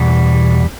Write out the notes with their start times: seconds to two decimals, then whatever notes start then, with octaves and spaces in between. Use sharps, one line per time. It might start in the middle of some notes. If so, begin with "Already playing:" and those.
Already playing: E2 B2 G3